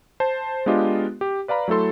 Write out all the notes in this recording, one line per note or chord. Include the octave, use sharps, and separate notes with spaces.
C5 A5
G#3 B3 D4 F4 G4 D#5
G4
B4 D5 F5 A#5 B5
F#3 A3 E4 A4 C6